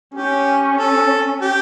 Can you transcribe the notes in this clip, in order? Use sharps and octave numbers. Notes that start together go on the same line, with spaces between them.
C#4 G4
A4
G4